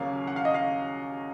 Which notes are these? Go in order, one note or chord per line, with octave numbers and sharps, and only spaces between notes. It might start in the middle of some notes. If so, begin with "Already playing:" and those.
Already playing: D#2 C#3 F#3 A#3 C#4 F5
F#5
F5
D#5
F5